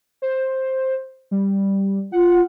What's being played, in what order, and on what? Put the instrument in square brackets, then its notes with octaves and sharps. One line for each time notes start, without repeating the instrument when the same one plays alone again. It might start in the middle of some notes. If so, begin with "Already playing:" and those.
[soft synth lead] C5
G3
[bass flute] F4 [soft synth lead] F#5